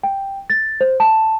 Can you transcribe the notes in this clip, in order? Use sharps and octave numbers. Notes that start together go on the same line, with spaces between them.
G5
A6
C5
A5